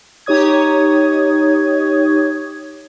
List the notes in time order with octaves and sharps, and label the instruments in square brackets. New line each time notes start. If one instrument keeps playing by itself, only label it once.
[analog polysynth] D#4 G4 C#5 D#6 G#6